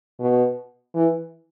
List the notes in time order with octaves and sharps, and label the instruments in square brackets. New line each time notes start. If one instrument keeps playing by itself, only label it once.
[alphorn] B2
E3